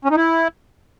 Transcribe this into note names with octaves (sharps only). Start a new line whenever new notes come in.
C#4
D#4
E4